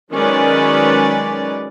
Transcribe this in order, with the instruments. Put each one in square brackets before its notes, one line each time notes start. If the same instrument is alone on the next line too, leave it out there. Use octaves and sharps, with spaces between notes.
[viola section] D#3 F#3 G#3 C#4 B4 D5